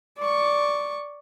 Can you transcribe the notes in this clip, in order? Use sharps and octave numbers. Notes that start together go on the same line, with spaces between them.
D5 C#6